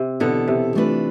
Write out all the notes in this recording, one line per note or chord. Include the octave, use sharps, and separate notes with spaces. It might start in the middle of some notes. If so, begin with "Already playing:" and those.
Already playing: C3
E2 B2 D3 B3 E4 A4
C3
E3 A3 D4 F4 B4